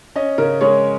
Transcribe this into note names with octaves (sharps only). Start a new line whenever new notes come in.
C#4 D#5
C#3 A#4
G#3 C#5